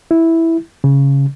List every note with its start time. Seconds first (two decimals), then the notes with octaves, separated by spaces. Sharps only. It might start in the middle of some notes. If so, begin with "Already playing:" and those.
0.11 E4
0.84 C#3